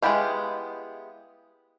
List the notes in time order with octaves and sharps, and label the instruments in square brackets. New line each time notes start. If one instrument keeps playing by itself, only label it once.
[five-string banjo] G#3 B3 E4 G4 F5